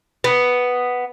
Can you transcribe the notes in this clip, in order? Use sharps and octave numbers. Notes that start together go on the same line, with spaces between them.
B3